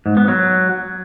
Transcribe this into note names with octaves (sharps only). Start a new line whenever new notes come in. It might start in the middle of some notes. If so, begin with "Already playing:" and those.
G#2
B3
F#3